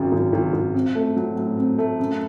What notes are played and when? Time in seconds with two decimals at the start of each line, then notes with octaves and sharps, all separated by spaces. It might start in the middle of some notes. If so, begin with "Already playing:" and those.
Already playing: G#1 F#2 C#3
0.12 G#1
0.33 G#1
0.53 G#1
0.75 C4
0.95 A3
1.17 F#3
1.37 A2
1.58 C4
1.78 A3
2.00 F#2